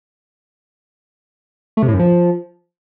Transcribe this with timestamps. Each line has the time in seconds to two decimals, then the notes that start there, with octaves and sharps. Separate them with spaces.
1.77 A3
1.83 C3
1.88 A2
1.94 F#2
1.99 F3